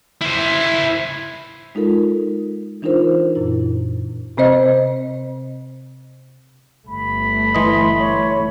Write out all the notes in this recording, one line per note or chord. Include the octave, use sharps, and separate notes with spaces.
E4 C5
G#3 D#4 F4 A4 A#4
E3 D4 D#4 F4 A#4 C5
F#2 A#2 E4
C3 C4 C5 D#5
G1 A3 B5
E3 D#5 C6
C#5